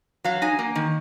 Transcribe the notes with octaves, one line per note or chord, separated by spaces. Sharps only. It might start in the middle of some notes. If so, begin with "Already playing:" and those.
F#3 F5
D#4 G#5
A#3
D#3